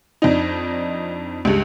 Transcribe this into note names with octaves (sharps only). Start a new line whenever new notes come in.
F2 D4 D#4
C#2 G2